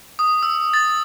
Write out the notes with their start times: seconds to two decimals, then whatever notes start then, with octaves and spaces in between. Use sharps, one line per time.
0.19 D#6
0.43 E6
0.74 A6